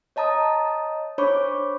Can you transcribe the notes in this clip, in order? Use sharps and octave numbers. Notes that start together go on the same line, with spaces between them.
C#5 D#5 A5 A#5 D#6
D4 C5 C#5 B5 C#6 D6